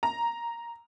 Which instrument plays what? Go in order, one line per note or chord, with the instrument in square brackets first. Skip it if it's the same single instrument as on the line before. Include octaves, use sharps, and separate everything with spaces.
[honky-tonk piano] A#5